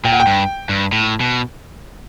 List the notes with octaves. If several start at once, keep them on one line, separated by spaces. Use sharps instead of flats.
A#2 G5
F#5
G5
G2
G2
A2
B2